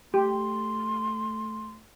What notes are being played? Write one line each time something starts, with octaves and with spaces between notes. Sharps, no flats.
A3 G4 C6